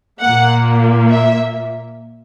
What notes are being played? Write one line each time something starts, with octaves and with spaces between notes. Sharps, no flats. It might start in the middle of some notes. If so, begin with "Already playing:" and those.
A#2 A#3 F#5
E5